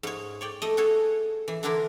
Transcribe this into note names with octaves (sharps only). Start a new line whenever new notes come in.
G#2 C#5
C#5 D5 G5
A3 D#5
F#4 G#4 A4 C#5
E3
D3 E3 D4 E4 F4 A#4